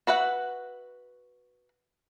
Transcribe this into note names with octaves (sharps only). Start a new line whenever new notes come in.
F#4 B4 E5 F#5